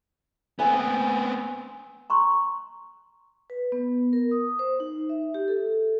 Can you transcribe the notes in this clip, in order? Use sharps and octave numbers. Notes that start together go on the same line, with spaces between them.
B3 C4 B4 G#5
A#5 C6 C#6
B4
B3
A#4
D#6
C5
D#4
E5
G4
A4